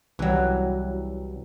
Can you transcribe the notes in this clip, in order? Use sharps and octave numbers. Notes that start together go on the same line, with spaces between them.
C2 E3 F#3 G3